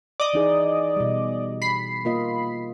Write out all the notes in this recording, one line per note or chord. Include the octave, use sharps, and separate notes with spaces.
D5 D#5
E3 D#4 G#4
B2 G3
B5 C7
A#3 F4 D#5